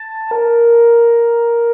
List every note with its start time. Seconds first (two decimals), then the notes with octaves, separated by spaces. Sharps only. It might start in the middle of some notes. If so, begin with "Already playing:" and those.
Already playing: A5
0.31 A#4